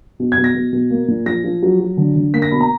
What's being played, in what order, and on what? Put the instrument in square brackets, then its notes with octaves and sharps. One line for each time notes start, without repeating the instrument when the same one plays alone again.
[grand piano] B2
G#6
B2
A#6
B2
B2
A#3
A#2
F3 A#6
F3
F#3
F#3
D3
D3
A#3 B6
A#6
B2 B5
A#5